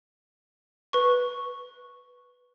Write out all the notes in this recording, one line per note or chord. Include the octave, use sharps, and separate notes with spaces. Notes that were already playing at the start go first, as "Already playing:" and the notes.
B4 C#6